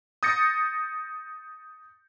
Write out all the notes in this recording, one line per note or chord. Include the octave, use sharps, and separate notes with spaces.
D#6 G6 A6 A#6 C#7